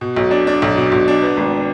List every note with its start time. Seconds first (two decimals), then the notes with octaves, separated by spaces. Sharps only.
0.01 B2
0.17 B1
0.31 D4
0.47 D4
0.62 B1
0.77 B2
0.92 B1
1.08 D4
1.22 B3
1.37 G#1